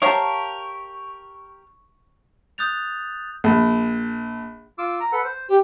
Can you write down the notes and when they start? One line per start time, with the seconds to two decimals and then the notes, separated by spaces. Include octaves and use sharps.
0.02 G4 A#4 C5 C#5 F5 A5 A#5 C#6
2.58 D#6 F#6 G6 A6 F7
3.44 A#1
4.78 F4 D6 E6
5.00 A#5
5.12 A4 B4 F#5
5.24 C5
5.49 G4